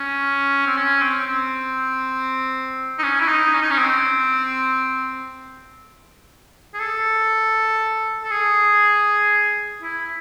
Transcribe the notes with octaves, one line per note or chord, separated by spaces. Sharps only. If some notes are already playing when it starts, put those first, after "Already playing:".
Already playing: C#4
C4
C#4
C4
C4
D#4
C#4
E4
D#4
C#4
D#4
C#4
C4
G#4
A4
A4
G#4
E4